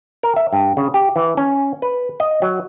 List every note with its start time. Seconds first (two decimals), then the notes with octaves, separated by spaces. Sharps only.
0.23 A#4
0.36 E5
0.53 G2
0.77 C#3
0.94 G4
1.16 E3
1.37 C#4
1.82 B4
2.20 D#5
2.42 F#3